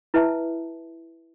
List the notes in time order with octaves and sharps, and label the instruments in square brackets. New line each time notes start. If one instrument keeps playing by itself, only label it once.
[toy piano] E4 B4 E5 A5